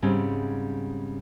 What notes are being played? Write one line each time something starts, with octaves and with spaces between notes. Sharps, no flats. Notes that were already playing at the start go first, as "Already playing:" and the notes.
G#2 C#3 G3 C4 C#4